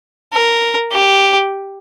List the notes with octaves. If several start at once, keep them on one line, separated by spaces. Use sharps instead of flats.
A#4
G4